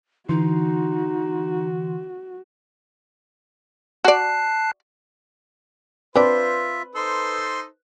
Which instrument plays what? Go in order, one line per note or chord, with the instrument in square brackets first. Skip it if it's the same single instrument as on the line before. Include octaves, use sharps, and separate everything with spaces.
[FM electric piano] D3 E3 C6 [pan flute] D#4 [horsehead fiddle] F#4
[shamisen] F#4 D5 [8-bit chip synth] A5 F#6 C7
[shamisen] C4 D4 D5 [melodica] F4 E5 [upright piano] B4 [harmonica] C5
[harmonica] D#4 A4 C5 [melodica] C6